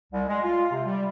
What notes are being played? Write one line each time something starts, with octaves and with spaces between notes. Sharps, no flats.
C2
G#3
F4
C3
G3